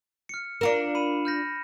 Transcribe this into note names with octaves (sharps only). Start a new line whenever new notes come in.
F6 C#7
D4 F4 A#4 C#7 E7
B5 D#7
F6 G6 A#6